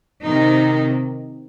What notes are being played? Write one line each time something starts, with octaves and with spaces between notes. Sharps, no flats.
C3 D#3 D#4